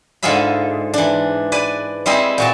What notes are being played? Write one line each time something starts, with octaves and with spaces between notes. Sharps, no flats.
G#2 D3 F4 G#4 E5 B5
E3 D4
B4 D5 G#5
G3 C4 E4 G#4 C5 D#5
A#2 F#4 A5